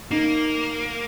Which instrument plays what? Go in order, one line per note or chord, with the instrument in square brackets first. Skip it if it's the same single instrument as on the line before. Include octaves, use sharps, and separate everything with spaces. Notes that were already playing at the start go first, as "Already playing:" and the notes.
[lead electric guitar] A#3 [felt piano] D#4